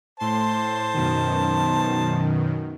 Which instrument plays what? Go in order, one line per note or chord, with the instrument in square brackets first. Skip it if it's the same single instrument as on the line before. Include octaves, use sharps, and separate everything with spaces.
[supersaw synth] A2 C6 [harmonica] C5 A5
[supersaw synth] F#2 B2 D#3